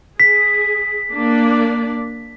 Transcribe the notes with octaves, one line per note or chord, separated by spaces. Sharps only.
G#4 B6
A#3 D4 D5